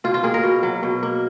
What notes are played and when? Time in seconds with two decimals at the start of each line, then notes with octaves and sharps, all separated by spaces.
0.04 B2 F4
0.14 F4
0.23 A#3 G#4
0.34 A#4
0.44 B2
0.63 F#3
0.83 B2
1.03 A#3